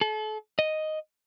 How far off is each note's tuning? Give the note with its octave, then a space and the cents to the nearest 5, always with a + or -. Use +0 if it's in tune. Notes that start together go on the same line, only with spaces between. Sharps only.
A4 -35
D#5 +0